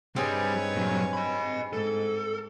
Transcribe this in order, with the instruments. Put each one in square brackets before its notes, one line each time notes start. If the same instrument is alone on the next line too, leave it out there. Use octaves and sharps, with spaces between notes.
[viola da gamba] G2 B4 C#5 [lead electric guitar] G3 [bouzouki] C4 D#4 G#4
[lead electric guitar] A#2 F#3
D#5 B5
[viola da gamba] G#2 [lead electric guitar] A4